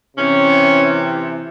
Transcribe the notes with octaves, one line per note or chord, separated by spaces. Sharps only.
C3 E3 C#4